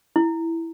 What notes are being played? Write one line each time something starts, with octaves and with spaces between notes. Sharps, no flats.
E4